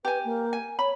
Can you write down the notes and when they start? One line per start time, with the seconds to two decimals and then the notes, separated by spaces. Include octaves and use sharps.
0.05 G4 B4 G#5
0.25 A#3
0.53 G#5
0.79 C#5 B5